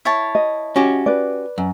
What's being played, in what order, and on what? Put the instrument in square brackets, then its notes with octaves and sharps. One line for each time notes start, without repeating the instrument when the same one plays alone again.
[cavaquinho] E4 C#5 A5
[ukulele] D#5
[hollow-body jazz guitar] C#4 F#4 G4
[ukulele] B4 D5
[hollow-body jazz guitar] F#2